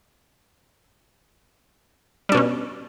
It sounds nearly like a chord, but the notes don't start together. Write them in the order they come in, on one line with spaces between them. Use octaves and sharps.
G3 D4 B2 C#4